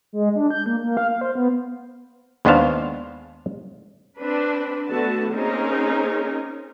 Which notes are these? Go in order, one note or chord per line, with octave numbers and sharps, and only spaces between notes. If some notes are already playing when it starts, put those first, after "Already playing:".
G#3
D4
G6
A#3
A#3
F5
F5
C5
B3
D#2 G#3 B3 D4 C5 F5
C4 D4 B4
D3 A3 B3 F#4 A5
A#3 C4 C#4 D#4 G#4 A#4